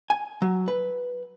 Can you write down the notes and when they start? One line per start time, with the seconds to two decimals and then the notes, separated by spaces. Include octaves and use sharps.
0.10 G#5
0.42 F#3
0.68 B4